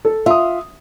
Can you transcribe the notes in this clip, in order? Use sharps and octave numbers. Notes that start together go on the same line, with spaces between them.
A4
F4 E5 D#6